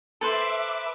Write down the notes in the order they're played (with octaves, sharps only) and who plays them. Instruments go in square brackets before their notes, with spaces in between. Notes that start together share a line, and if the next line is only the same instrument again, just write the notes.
[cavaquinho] A4 B4 C5 [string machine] E5 D6